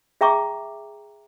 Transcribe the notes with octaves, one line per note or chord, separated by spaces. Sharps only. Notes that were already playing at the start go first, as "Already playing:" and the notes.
G#4 E5 G5 A#5 C#6 D6